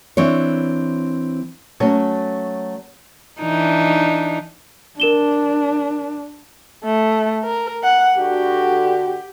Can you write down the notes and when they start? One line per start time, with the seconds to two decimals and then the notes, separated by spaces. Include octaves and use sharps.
0.17 E3 C4 D4 C#5
1.80 F#3 A3 C#4 A4 C#5
3.41 E3 D4 D#4
5.00 D4 A#4 E7 G7
6.84 A3
7.44 A#4
7.84 F#5
8.18 D3 F#4 G4